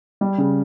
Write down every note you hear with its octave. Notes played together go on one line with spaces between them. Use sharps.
G3
C#3